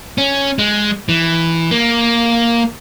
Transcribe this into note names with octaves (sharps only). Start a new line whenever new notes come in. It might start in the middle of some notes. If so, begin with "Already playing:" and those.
C#4
G#3
E3
A#3